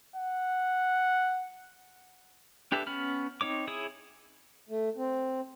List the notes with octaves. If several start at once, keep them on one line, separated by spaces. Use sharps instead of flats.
F#5
D4 G4 A4 B4 E5
B3 C#4 B5 F6
C4 D#4 C#5 D6
E4 G#4 C#5 D#6
A3
C4